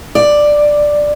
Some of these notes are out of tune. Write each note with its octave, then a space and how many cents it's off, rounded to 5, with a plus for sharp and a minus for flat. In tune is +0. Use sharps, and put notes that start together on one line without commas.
D5 +5